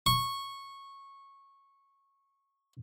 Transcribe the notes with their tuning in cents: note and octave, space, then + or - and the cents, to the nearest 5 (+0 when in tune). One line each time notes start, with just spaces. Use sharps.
C#6 -15